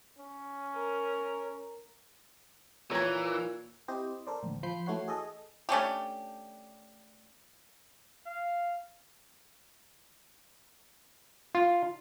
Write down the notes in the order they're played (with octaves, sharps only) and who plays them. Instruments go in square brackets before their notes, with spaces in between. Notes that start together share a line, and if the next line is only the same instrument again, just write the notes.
[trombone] C#4
[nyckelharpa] A#4
[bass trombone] A#2 [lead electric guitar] E3 [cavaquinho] A#4 A#5 [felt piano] C#5 C#6 G#6
[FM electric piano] C4 E4 G4 C5 D#5
A4 A#4 C5 D5
A1 D2
F3 B5 C6 G6 C7
E3 A3 F#4 C#5 F#5 C7
G#4 A4 D#5
[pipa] A3 C#4 D4 G4
[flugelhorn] F5
[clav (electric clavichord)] F4